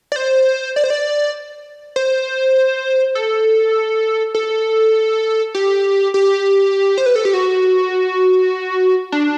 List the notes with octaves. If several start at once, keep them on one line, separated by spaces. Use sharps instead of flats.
D5
C5
D5
C5
D5
C5
A4
A4
G4
G4
C5
B4
A4
G4
F#4
D4